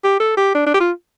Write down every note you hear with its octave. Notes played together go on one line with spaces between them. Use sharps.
G4
A4
G4
D4
D4
G4
F4